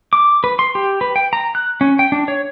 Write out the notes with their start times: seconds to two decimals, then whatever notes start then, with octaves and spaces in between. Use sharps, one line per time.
0.13 D6
0.44 B4
0.59 C6
0.75 G4
1.01 B4
1.16 G5
1.33 A#5
1.55 F#6
1.81 C#4
1.99 G5
2.12 D4
2.28 C#5